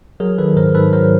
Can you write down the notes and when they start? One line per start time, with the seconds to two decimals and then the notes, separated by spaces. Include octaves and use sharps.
0.20 F#3 G#4 A#4
0.38 D#3 A4 B4
0.56 G#2 A#4 C5
0.75 G#2 A4 B4
0.93 F#3 A#4 C5